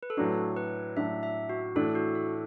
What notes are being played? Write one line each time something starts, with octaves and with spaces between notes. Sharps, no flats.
B4
A4
A2 F#3 D4 F#4
B4
A2 F#3 D4 E5
E5
F#4
A2 E3 D4 A4
F#4
A4